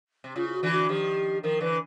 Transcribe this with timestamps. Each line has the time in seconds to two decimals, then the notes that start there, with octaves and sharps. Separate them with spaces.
0.24 C3
0.36 C#3 F4
0.49 F4
0.54 F#4
0.63 D3 E3
0.72 F#4
0.89 D#3 F3 G4
1.43 D#3 F3 A#4
1.60 D3 E3 B4